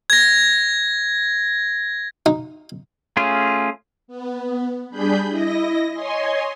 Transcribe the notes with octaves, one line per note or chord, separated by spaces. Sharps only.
G#6 A#6
D#4
A3 C#4 F4 G#4
B3
G3 D4 G#4 B5 G6
E4 D#5 A#6
C#5 D#5 G#5 C6